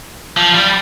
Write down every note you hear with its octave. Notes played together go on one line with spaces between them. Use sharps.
F3
G3